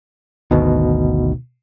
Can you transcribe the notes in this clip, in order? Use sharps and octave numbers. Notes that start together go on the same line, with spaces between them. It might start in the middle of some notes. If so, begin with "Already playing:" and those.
G#1 D2 B2 D#3